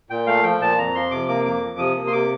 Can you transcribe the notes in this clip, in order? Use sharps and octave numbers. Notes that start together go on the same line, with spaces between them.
A#2 G5
A3 F5
F3 G5
A#2 A5
F2 A#5
F3 C6
C3 D6
A#3 D6
F2 D6
F3
C3 D#6
A#3
C6
C3 D6